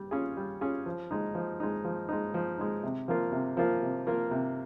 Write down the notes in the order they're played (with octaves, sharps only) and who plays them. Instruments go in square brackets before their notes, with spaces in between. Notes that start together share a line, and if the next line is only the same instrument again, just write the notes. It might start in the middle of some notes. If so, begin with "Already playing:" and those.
Already playing: [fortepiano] G3
C#4 F4 G#4
G3
C#4 F4 G#4
F3
G#3 D#4
F3
G#3 D#4
F3
G#3 D#4
F3
G#3 D#4
C3
F3 A#3 F4 A#4
C3
F3 A#3 F4 A#4
C3
F3 A#3 F4 A#4
C3